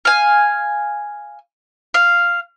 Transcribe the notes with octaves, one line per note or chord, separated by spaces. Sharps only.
F5 G#5
F5